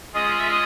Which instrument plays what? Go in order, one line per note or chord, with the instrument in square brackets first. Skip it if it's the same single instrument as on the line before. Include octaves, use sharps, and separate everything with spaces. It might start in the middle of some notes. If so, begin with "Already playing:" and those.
[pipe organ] G#3 C#4 F4 G#4 [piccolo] D#5
[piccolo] E5
D#5